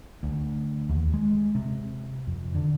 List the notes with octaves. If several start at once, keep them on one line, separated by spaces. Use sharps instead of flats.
D2
D#2
G#3
C3
F2
D3